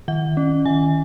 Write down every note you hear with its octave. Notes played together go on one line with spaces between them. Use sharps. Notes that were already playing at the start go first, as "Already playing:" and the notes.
D#3 F#5
C#4
D#3 G#5